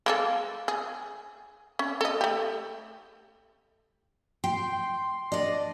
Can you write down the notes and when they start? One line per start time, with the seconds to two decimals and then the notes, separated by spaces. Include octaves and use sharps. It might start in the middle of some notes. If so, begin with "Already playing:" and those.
0.06 G#3 A#3 A4
0.68 G#4
1.79 C#4
2.01 A4 D#5
2.21 A3 G4
4.44 G5 C6
5.32 D4 D5 D#5